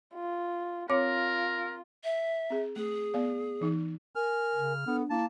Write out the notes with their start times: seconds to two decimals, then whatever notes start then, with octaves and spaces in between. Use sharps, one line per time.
0.15 F4
0.90 C4 F4 A#4 C#5 D6
2.04 E5
2.50 C4 G#4
2.76 A3 G#4
3.14 B3 D5 F5
3.61 E3 D#4
4.15 A#4 G#5 F6
4.54 C#3
4.87 B3 D4 A4
5.10 A#3 E4 A5